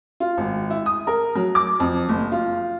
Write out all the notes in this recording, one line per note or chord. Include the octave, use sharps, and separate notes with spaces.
F4
G#1
E4
D#6
A#4
F#3
D6
F2
F#1
F4